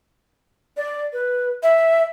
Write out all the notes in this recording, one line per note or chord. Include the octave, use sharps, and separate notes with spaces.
D5
B4
E5